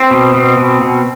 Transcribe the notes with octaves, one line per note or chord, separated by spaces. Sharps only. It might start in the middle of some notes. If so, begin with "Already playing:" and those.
Already playing: C4
B2
B2
B2
B2